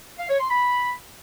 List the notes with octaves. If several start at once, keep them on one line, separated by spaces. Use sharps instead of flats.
F5
C#5
C6
B5